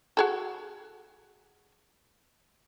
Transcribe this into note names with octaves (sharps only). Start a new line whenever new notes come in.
F#4 G#4 A4